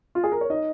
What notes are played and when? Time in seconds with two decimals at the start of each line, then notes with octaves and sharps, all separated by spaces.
0.15 F4
0.23 G#4
0.32 A#4
0.41 C#5
0.50 D#4 D#5